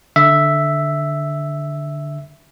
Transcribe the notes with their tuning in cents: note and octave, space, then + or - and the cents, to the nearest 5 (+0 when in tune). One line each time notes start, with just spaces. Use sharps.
D3 +0 E5 +0